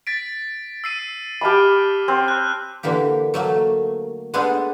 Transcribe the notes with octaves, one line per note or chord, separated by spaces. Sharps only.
A6 B6 D7
E6 C7 D#7
G4 A5 B5 D6 F6
C4
F#6
D3 E3 A#3 G4
F#3 A3 A#3
G#3 B3 D4 D#4 G#4 A4